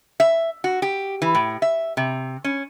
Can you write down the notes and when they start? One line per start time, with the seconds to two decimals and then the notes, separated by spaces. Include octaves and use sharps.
0.20 E5
0.64 F#4
0.82 G4
1.22 E3
1.35 A2
1.62 E5
1.97 C3
2.44 C#4